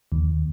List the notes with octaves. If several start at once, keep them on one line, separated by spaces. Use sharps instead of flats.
D#2